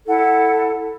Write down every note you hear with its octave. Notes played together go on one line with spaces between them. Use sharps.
E4 A4 F#5